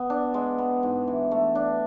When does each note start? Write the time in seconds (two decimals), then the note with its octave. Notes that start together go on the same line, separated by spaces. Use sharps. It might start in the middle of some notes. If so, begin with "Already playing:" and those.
Already playing: B3
0.10 D4
0.34 G#3
0.58 B3
0.83 G#2
1.08 E3
1.31 A3
1.55 D4